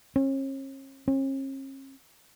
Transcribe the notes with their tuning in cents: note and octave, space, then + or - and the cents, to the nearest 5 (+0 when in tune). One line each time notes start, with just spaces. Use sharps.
C#4 -40
C#4 -45